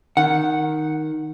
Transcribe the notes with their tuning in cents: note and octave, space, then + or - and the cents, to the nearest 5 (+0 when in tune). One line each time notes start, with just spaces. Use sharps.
D#3 +0 F#5 +0